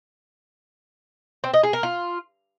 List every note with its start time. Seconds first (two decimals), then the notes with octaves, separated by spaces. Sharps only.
1.44 C4
1.54 D#5
1.63 G#4
1.73 A#4
1.83 F4